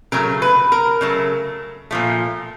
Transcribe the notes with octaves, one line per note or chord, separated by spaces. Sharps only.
C#3 F#3 A3 A#4
B4
A#4
C#3 F#3 A3
A#2 F3 A3